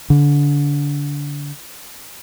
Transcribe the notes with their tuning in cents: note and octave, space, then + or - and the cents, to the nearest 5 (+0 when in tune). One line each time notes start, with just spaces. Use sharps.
D3 -25